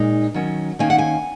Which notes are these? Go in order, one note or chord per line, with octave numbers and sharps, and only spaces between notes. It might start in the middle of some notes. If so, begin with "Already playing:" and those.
Already playing: A#2 G#3 D#4
D#3 F#3 C#4
D#3 A#3 C#4 G#5
F#5
G#5